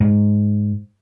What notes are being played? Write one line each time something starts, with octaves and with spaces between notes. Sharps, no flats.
G#2